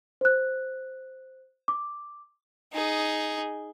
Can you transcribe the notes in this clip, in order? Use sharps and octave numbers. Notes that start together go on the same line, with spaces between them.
C5 F#6
D6
D#4 G#4